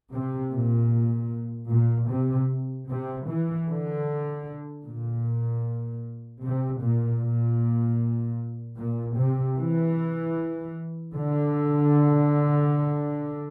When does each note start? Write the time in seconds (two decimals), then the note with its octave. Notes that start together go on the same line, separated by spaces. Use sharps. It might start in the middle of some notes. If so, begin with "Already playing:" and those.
0.12 C3
0.53 A#2
1.71 A#2
2.09 C3
2.88 C3
3.28 E3
3.68 D3
4.85 A#2
6.42 C3
6.81 A#2
7.21 A#2
8.78 A#2
9.17 C3
9.57 E3
11.14 D3